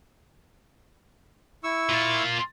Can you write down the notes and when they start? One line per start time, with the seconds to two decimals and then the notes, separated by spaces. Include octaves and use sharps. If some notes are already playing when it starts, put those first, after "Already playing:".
1.64 E4 C#6 E6
1.89 A#2 F4